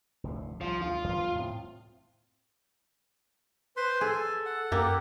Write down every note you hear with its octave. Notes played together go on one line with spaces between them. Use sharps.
F1 D2 A2
C2 F3
D2 F4
E2 D3 G3
A2 C4
B4 C5 C6
G#4 A4 G#5
F#5
F#2 A#3 G4 A#4